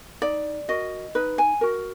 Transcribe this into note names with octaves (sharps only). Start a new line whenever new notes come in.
D#4 D5
F#4 A#4 D#5
D#4 B4
G#5
F#4 A#4